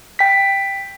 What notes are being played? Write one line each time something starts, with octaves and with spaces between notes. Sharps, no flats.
G5 B6